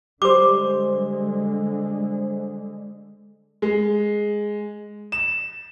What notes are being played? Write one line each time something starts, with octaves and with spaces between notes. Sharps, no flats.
D3 G3 G#3 C5 D6
G#3
E7